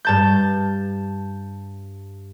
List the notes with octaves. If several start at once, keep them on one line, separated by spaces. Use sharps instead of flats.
G2 A5 G6